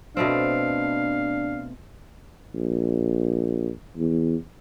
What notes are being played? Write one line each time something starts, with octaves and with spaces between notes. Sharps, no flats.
B2 A3 C4 D4 F5
A#1
E2